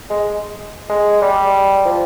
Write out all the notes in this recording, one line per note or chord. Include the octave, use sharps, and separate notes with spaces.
G#3
G#3
G3
F3